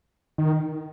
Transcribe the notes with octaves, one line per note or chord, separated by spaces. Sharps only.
D#3